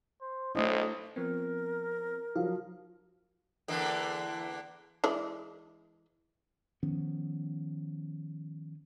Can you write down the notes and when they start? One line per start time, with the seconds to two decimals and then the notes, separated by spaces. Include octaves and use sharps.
0.21 C5
0.55 B1 A3 D4 E4 C5 D#5
1.16 F3 B3 C4 A#4
2.35 F3 F#3 F5
3.68 E2 D3 A#3
5.04 E3 G#3 D5
6.83 D#3 F3 B3 C#4